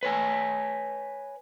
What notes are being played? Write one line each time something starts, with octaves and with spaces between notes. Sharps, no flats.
B4 C#5 G#5